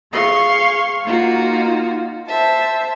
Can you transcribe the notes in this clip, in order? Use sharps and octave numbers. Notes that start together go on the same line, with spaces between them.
G#4 F5 C6 C#6
A#3 D#4 F4 F#4 F5
C5 E5 A5